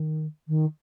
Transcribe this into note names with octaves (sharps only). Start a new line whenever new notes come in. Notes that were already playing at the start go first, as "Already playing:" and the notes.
Already playing: D#3
D#3